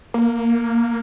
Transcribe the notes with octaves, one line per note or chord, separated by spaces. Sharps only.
A#3